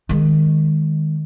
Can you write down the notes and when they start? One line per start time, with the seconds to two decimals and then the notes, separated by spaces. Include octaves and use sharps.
0.09 D#3 G#3